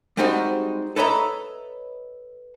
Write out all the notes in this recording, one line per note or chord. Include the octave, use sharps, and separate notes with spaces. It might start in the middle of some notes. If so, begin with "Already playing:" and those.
G3 G#3 C4 D#4 F#4
A4 B4 C#5 D#5 E5 A#5